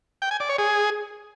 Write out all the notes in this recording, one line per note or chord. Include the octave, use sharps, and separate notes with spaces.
G5
G#5
D5
C#5
G#4